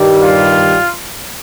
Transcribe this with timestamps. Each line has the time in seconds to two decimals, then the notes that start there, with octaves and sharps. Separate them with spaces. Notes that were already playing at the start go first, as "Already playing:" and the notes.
Already playing: G2 D#3 G3
0.21 F4